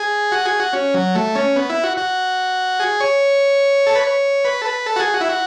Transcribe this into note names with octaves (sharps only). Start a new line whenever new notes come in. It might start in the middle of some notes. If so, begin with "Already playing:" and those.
Already playing: G#4
F#4
G#4
F#4
C#4
F#3
A3
C#4
B3
E4
F#4
F#4
G#4
C#5
A4
B4
C#5
B4
A4
B4
A4
F#4
G#4
F#4
E4
F#4